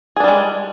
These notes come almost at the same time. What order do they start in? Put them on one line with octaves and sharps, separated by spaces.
G#4 D4 G3 G#3